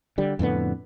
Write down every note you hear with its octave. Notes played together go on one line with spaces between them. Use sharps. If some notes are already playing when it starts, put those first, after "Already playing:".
D3 G3
F2 A2 D3 B3